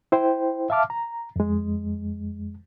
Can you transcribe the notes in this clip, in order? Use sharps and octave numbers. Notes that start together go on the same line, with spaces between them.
E4 C5 G5
E5 F5 A5 D6 F6
A#5
F2 G#3